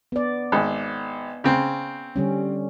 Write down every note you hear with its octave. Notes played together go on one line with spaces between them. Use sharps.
B3 D5
G#1
C#3 C4
D3 G3 C#4